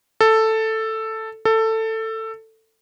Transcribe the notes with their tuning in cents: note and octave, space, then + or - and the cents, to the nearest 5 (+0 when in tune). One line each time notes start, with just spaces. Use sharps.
A4 +5
A4 +15